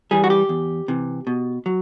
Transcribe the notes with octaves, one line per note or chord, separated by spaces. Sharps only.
E3 G3 G#4
F#4
G4
E2
C3 E3
B2
F#3